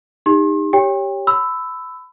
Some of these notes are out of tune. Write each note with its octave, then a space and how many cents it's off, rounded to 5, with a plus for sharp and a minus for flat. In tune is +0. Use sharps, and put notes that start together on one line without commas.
D#4 +0 G4 +35 C6 +40
G4 +0 C#5 +0 G5 +30
B5 +25 E6 +0